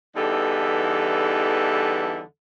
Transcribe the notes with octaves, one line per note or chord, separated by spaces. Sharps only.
E2 D3 E3 G3 D#4 A4